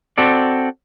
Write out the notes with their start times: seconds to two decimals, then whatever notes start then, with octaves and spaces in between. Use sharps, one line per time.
0.18 C4 F#4 A4 D5